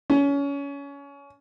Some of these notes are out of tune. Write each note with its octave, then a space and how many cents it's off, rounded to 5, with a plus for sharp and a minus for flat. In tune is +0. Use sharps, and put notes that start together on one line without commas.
C#4 +25